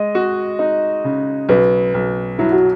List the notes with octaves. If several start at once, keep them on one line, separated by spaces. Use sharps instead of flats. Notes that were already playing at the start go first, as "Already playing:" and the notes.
Already playing: G#3 D#5
F#4
D#4
C#3
B1 B4
B1
F#3 E4
F#4